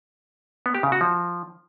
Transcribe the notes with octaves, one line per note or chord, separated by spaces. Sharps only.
B3
G4
C#3
F#4
F3